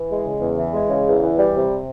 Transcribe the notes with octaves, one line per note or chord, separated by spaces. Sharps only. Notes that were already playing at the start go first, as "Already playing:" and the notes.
Already playing: E3
G#3
C#3
E2
E3
G#3
C#3
E2
E3
G3
C3